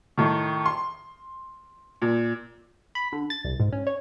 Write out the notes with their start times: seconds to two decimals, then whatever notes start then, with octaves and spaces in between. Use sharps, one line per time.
0.18 A2 D#3
0.66 C6
2.02 A#2
2.95 B5
3.12 D3
3.30 A6
3.45 C2
3.60 G#2
3.72 C#4
3.87 C#5